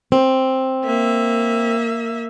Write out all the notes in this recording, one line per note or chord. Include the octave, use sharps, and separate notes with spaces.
C4
A#3 E5